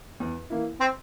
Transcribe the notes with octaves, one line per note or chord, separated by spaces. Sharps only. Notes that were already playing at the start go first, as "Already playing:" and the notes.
E2
E3 A#3 E4
C4